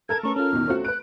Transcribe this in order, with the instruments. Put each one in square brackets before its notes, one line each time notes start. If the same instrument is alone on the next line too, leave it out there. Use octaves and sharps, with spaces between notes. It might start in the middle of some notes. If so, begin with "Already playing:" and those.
[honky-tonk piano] A4 A#4 A5 [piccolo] G#6
[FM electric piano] A3 C#4 B4 [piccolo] C#6
[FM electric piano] C#4 F4 [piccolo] F6
[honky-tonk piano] E2 B2 D#3
A3 C4 F#4
[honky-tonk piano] B4 D7 [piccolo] F#6